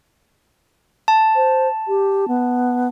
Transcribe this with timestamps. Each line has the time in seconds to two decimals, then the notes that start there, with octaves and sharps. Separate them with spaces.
1.08 A5
1.36 C5
1.88 G4
2.28 B3